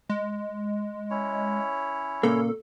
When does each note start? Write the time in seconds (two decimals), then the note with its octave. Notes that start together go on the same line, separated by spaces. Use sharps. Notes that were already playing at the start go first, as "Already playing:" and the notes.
0.09 G#3
1.10 C#4 E4 C#5
2.23 A#2 C#3 A#3 A4